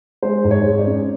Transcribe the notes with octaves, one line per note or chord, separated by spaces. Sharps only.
G#3 C5
G#2
C#5
G#3
D5
C#4